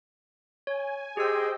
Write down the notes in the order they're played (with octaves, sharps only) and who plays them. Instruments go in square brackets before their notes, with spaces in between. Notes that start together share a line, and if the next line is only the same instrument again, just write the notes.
[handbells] C#5 [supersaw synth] G#5
[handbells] G4 E6 [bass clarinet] G#4 [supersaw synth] C5 D#5 G5